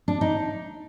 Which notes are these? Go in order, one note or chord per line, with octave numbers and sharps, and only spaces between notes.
D4
D#4